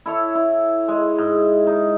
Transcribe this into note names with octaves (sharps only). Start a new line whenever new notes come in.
E4 A4 C#5 E5
E4
G#3
G#2
D#4